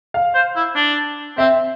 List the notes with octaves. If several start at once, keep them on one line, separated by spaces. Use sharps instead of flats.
F5
C5
E4
D4
C4 E5